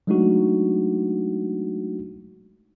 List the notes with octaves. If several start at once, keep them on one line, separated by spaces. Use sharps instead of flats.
F#3 G#3 A3 D4 D#4 F#4